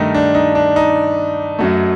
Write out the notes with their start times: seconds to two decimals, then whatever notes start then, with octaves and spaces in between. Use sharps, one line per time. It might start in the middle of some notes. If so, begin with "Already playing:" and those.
Already playing: G2 D#3 A3 D#4
0.15 D4
0.35 D#4
0.55 D4
0.76 D#4
1.59 F#2 F#3 A3